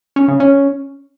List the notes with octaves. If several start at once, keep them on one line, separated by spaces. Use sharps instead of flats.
C#4
C#3
C#4